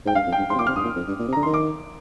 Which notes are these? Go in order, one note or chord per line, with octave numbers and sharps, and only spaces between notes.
G#2 G5
G2 F5
F2
G5
G2
G#2 C6
C3
A#2 D6
C3 F6
G2 D#6
A#2
F2
G2
A#2
C3
D3 A#5
D#3 C6
D6